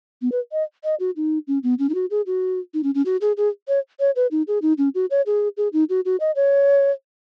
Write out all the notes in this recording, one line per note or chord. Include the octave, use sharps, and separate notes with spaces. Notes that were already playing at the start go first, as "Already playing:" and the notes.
B3
B4
D#5
D#5
F#4
D#4
C#4
B3
C#4
D#4
F#4
G#4
F#4
D#4
C#4
C#4
F#4
G#4
G#4
C#5
C#5
B4
D#4
G#4
D#4
C#4
F#4
C#5
G#4
G#4
D#4
F#4
F#4
D#5
C#5